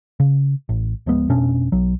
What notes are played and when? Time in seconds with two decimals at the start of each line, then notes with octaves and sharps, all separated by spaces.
0.20 C#3
0.69 A1
1.06 D1 F3 G#3 B3
1.29 F1 B2 C#4 D4
1.72 B1 F#3